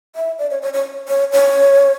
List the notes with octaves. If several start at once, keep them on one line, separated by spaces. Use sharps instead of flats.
E5
D5
C#5
C#5
C#5
C#5
C#5